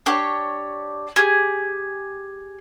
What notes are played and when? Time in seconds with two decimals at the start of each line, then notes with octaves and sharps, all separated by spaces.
0.06 D4 G4 C#5
1.16 G4 G#4